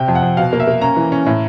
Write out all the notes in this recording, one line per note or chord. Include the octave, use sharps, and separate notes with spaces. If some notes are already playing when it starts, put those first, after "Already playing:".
Already playing: C3 G5
F2
F#5
F2
B2 F5
A#3
E5
A#3
C#4 A#5
E3
C#4
A2